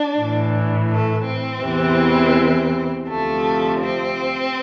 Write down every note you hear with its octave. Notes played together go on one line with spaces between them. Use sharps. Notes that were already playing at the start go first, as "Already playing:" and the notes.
Already playing: D4
A2 E3
A3
C4
E2 C3 E3
D2 C3 F3 A3
C4